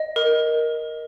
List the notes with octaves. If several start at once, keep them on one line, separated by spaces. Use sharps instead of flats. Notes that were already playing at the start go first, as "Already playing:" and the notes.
Already playing: D#5
A#4